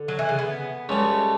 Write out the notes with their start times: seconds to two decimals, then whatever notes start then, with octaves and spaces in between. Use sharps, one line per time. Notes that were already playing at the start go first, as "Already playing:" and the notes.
Already playing: D3
0.08 F#3
0.19 E3
0.29 C#3
0.39 B3
0.89 C#2 C#3 G3 A3